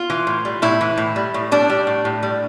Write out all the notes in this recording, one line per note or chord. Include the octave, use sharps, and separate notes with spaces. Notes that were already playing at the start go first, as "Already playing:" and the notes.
Already playing: F4
E3
A2
G3
A2 E4
E3
A2
G3
A2
G3 D4
G3
A2
A2
G3